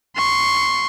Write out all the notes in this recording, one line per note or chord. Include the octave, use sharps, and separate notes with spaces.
C6 C#6